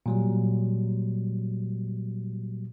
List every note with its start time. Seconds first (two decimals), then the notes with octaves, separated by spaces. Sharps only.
0.06 A#2 F#3 G3